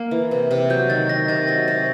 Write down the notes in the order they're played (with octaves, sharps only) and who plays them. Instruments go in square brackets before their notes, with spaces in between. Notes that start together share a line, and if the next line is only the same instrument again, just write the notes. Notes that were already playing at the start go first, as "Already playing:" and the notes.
Already playing: [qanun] A#3
E3
C3
C3
[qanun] F#3 [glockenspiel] G6
[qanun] D#3 [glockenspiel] A6
[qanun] D#3 [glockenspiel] A#6
[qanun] C3 [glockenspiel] A6
[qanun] F#3 [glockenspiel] A#6
[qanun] C3